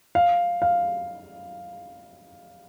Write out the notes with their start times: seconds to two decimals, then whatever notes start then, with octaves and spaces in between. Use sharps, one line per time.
0.15 F5
0.62 F5